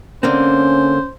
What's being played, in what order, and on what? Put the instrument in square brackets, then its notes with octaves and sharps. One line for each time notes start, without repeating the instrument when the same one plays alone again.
[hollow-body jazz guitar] D3 A#3 C4 [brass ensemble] C#4 [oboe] C5